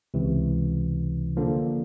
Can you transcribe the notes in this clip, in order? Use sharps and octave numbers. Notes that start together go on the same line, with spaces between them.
C#2 C3 E3
D3 F3 A#3